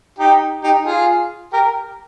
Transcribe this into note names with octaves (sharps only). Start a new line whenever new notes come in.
D#4 G4
D#4 G4
F4 G#4
G4 A#4